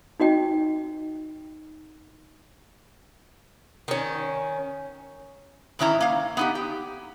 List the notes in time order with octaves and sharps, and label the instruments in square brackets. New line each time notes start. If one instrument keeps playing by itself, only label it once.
[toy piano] D#4 F#4 D#5 G5
[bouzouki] D#3 C#4
[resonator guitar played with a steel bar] G#2 D#3 C#4 E4 A#5
A#3 F5
B3 D#4 G4
G4